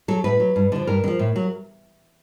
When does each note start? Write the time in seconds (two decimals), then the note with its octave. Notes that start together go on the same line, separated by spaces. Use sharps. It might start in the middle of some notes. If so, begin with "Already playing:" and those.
0.08 F#3 A4
0.24 A2 B4
0.40 F#3
0.56 G2
0.72 D3 F3
0.87 G2 A#4
1.04 D3
1.08 F3
1.19 A2
1.36 F#3